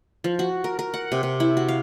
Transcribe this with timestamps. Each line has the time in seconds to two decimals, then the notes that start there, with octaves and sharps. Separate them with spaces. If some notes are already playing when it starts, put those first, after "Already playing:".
0.24 F3
0.39 F#4
0.64 A#4
0.79 A#4
0.94 F#5
1.12 C3
1.23 C3
1.40 E4
1.57 F#4
1.68 F5